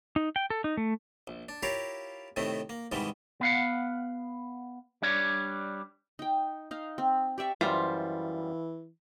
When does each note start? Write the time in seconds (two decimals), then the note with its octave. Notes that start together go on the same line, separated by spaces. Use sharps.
0.16 D#4
0.36 G5
0.50 A4
0.64 D#4
0.77 A3
1.27 A#1
1.49 D4
1.63 E4 F4 G4 A#4 C#5 F5
2.36 A2 C3 D#3 A3 C4
2.69 A#3
2.92 G#2 C3 D#3 E3 G3 G#3
3.41 B3 F5 F#5
5.02 G3 D4 C#5
6.19 D#4 G5
6.71 D#4 F5
6.98 C4
7.38 G4 D5 E5 C#6
7.61 F#2 E3 G3 F4 C5 E5